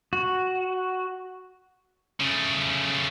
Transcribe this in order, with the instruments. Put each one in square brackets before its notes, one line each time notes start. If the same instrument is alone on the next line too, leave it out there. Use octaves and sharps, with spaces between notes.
[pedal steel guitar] F#4
[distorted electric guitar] C#3 A3